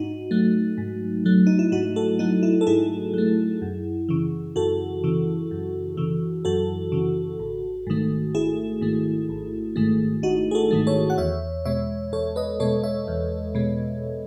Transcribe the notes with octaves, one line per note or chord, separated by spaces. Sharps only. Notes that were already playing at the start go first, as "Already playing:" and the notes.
Already playing: G#2 D#4 F#4
F#3 A3
G#2
F#3 A3
D#4
E4
G#2 D#4 F#4
F#4 A4
F#3 A3 D#4
E4
A4
G#2 E4 G#4
F#3 A3
F#2
C#3 E3
F#2 F#4 A4
C#3 E3
F#2
C#3 E3
F#2 F#4 A4
C#3 E3
G#1
G#2 D#3 A3
G#1 E4 G#4
G#2 D#3 A3
G#1
G#2 D#3 A3
G#1 D#4 F#4
G#4
F#4 A4
G#2 D#3 A3
A4 C#5
F#5
E2 C#5 E5
B2 G#3 C#5 E5
E2 A4 C#5
B4 D#5
B2 G#3 A4 C#5
C#5 E5
E2
B2 G#3